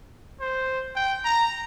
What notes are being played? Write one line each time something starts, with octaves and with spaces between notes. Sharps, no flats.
C5
G5
A#5